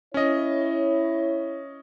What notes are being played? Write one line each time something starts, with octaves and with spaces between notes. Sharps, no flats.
C#4 E4 C#5 D#5